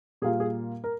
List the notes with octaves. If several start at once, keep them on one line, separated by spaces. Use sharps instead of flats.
A#2 G3 A#3 F4 G#4
G#4
A#4